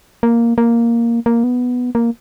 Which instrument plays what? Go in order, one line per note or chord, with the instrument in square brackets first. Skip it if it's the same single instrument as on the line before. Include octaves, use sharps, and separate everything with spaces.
[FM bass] A#3
A#3
A#3
B3
A#3